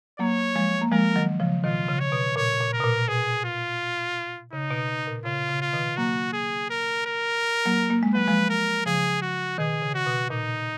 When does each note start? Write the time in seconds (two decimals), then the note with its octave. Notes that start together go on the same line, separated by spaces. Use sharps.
0.19 F#3 A#3 C#5
0.56 F3 G#3
0.82 A#3
0.92 F3 G#3 A#4
1.16 D#3 F#3
1.40 C#3 F3
1.64 B2 D#3 F4
1.88 C#3
2.00 C#5
2.12 B2
2.36 A#2 C#5
2.61 A#2
2.73 A#4
2.80 B2
2.84 A#2
3.08 B2 G#4
3.44 F4
4.53 C#3 D#4
4.71 B2
4.89 B2
5.07 A#2
5.25 C#3 F4
5.49 C#3
5.61 F4
5.73 B2 D#3
5.97 F#3 A#3 F#4
6.33 G#4
6.70 A#4
7.06 A#4
7.65 F#3 A#3
7.90 A#3
8.03 G#3
8.14 F#3 B4
8.28 F3 G#3
8.50 A#4
8.86 C#3 F3 G#4
9.22 F#4
9.58 B2 D#3 G#4
9.82 C#3
9.95 F#4
10.06 B2
10.30 A#2 D#4